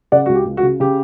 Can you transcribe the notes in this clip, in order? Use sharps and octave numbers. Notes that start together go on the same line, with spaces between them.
C#3 D5 F#5
C#2 F#4
G4
C#2
F#4
C#3
C#3 G4